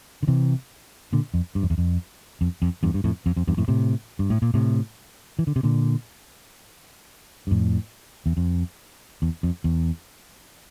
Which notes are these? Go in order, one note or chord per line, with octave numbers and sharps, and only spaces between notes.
D3
C3 E3
A#2 D3
F2
G2
F2
E2
F2
F2
F2
E2 G2
G2
F2 A2
F2
F2
E2 G2
F2 A2
A2 C3
G2
A2
A#2
A2 C3
E3
D3
C3
A#2 D3
G2
F2 A2
E2
F2
E2
F2
E2